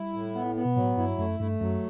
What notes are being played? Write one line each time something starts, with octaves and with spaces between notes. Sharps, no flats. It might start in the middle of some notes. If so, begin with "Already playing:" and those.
Already playing: G3 E4
A2
B3
B3
B2
A2 F#3
G2 E4
F#2 A3
G2 A3
F#2 F#3